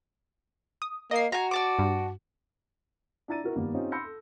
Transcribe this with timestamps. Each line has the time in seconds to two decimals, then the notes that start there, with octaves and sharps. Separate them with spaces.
0.82 D#6
1.11 A#3 D#5 C7
1.32 F#4 G#5 A#5
1.51 D5 A5 D6
1.79 G2
3.28 D4 E4 A#5 A6 D#7
3.44 E4 F#4 A#4
3.55 G2 D#3 A#3 B3
3.74 C4 C#4 D#4 F4 G4
3.92 B5 C6 E6 G6 A#6 C#7
4.04 A4